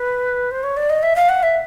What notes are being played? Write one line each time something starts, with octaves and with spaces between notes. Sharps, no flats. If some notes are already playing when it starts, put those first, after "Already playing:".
Already playing: B4
C5
C#5
D5
D#5
E5
F5
F#5
E5